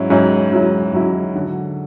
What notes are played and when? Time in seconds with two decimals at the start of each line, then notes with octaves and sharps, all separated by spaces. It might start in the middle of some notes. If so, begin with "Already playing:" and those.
Already playing: G#2 F#3 C#4 E4
0.10 G#2 F#3 C#4 E4
0.52 G#2 F#3 C#4 E4
0.93 G#2 F#3 C#4 E4
1.35 D3 F#3